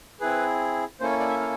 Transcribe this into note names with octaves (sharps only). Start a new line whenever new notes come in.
C4 E4 G#4 B4
A#3 C#4 E4 A4 C5
C#5
D5
E5
F5